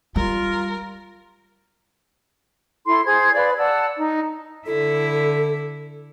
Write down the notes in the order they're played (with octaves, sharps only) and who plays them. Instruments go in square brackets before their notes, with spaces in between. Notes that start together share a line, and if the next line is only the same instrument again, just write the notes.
[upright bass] G3 [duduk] F4 [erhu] A#4
[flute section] E4 A4 C6
G#4 C5 G#6
B4 D5 F5
D5 F#5 A5 E6
D#4
[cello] D3 E4 [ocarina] A4